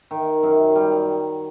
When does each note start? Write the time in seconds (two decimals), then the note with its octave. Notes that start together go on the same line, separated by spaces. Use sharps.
0.11 D#3
0.43 F#2
0.75 G3